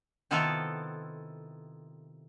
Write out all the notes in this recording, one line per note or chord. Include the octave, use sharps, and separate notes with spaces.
C3 D#3 B3 E4 F4 A4